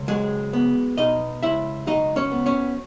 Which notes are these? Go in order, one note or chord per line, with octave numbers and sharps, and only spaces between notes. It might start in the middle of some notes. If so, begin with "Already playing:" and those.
Already playing: C#2
F#3 G#3 G#4
B3
B2 D#4 D#5
C#2 E4 E5
F#3 D#4 D#5
C#4 C#5
B3
C#4 C#5